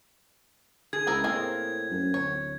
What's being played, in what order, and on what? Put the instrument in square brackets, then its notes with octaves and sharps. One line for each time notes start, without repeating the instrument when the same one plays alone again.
[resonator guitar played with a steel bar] G#4 [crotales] G#6
[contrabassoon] C#2 [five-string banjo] B3 E4 A#4
[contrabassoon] A2 [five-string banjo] A3 G#4 [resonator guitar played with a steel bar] A#3 C4
[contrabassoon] F#2
[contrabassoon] D1 [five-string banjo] C#5